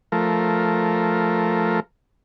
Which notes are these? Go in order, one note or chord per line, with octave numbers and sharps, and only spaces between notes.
F3 A3 A#4